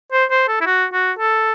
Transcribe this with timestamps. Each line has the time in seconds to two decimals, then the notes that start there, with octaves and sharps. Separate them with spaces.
0.12 C5
0.31 C5
0.48 A4
0.61 E4
0.66 F#4
0.93 F#4
1.19 A4